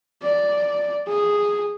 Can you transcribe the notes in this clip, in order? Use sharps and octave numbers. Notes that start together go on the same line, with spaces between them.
D5
G#4